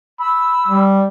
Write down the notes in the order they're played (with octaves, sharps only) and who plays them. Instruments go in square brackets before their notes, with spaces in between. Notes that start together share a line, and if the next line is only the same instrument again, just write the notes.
[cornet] B5 [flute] E6
[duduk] G3